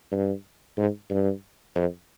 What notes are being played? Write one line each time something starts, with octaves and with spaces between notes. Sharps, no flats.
G2
G#2
G2
F2